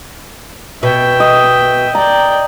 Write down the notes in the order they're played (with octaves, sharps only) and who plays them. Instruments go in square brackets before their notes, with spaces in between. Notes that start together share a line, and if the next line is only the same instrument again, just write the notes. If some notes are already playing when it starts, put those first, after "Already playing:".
[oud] B2 [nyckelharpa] E5 G5
[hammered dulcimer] D#5
[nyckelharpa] D5 G5 [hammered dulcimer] A#5